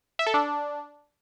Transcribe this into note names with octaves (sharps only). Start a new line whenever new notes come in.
E5
A4
D4